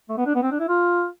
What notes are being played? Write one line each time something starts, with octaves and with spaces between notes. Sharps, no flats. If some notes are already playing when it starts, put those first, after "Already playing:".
A3
B3
D4
B3
C4
D4
E4
F4